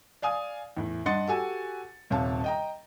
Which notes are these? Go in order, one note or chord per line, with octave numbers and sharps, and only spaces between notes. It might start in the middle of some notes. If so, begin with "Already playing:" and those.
D5 F5 G#5 D#6
E2 A2
G2 D#5 F#5 C6 A6 C#7
F#4 G4 A4 F#5 G#5 E6
D#1 C3 C#5 F5 A5
D#5 G5 A#5